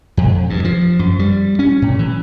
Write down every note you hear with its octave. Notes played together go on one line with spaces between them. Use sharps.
F2
G2
F3
F#2
G3
C#4
A2
E3